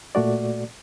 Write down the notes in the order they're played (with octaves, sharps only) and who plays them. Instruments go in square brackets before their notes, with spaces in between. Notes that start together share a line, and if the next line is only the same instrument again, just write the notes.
[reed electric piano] A#2 A3 F#4 D5